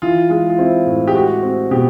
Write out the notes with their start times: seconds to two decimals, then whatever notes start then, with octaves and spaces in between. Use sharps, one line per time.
0.02 E3 F4
0.30 G#3 F4
0.50 F4
0.58 C4 E4
0.86 A2
1.08 G4
1.14 G#3 F#4
1.43 C4
1.71 B2 G4